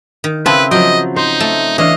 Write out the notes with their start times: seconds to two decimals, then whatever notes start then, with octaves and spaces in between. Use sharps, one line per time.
0.24 D#3
0.46 C#3 C4 E4 B4 A5
0.71 F3 F#3 D#5 G5
1.16 D#4 C5
1.40 A3
1.78 E3 D4 C#5 D#5 F5